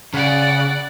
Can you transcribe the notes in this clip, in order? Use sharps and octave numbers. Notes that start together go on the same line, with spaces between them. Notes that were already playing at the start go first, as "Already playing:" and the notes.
C#3 D5 F#5